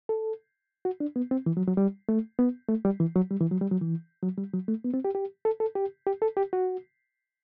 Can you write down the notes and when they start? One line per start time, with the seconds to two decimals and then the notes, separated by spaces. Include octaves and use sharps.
0.09 A4
0.85 F#4
1.00 D4
1.16 B3
1.31 C4
1.46 E3
1.57 F#3
1.67 F#3
1.77 G3
2.09 A3
2.39 B3
2.69 A3
2.85 G3
3.00 E3
3.15 F#3
3.31 G3
3.41 E3
3.51 F#3
3.61 G3
3.71 F#3
3.82 E3
4.23 F#3
4.38 G3
4.53 F#3
4.68 A3
4.84 B3
4.94 C4
5.05 G4
5.15 G4
5.45 A4
5.60 A4
5.75 G4
6.07 G4
6.22 A4
6.37 G4
6.53 F#4